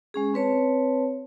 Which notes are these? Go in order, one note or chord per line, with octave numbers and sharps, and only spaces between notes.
G#3 C#4 G#4
C4 B4 C#5 A5